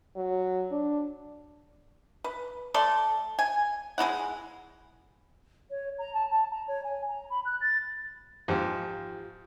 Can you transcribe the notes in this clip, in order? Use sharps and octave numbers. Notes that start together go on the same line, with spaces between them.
F#3
D4
B4
A3 A4 D5 C6
G#5
G#3 D#4 E4 F#5
C#5
A#5
A5
A5
A#5
C#5
G#5
A#5
B5
F#6
A6
G#2 F3 F4 G4